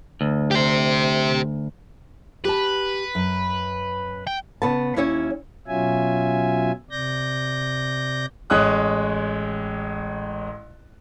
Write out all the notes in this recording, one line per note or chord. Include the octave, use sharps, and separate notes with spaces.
D2
G4 C5
G4 B4 A5
F#2
G5
C#3 B3 A5
D#2 C#4 E4 C#5
B2 F#3 C#4 F4 E5 G#5
C3 D5 G6 A#6
A1 G#3 C#5 D#6 F#6